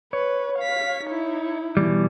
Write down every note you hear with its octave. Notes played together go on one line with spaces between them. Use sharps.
B4 C#5
F5 B6
D#4 E4
B2 E3 G3